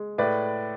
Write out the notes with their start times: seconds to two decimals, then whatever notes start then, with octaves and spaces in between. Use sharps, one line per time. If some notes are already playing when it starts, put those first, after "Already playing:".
Already playing: G#3
0.18 A2 B4 D5